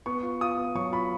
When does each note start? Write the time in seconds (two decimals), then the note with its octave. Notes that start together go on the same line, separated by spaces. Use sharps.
0.06 B3 C#6
0.23 F4
0.41 F4 D#6
0.58 B3
0.75 F#3 C#6
0.92 F4 B5